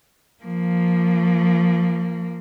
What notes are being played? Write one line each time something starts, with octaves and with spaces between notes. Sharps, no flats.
F3 A#3